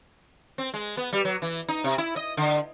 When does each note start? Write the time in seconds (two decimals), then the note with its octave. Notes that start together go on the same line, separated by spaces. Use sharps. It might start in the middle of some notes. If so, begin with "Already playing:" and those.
0.58 C4
0.74 G#3
0.97 B3
1.13 G3
1.25 F#3
1.42 E3
1.68 D#4
1.84 C3
1.98 E4
2.16 D#5
2.37 D3